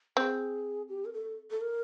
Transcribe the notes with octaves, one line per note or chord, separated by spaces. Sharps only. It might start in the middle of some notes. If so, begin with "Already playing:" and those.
C4 G#4
G4
A#4
A4
A4
A#4